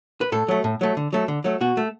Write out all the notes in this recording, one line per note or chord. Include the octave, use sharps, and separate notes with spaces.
B4
A2 A4
F#3 A3
A2
F#3 A3
D3
F#3 A3
D3
F#3 A3
B2 F#4
A3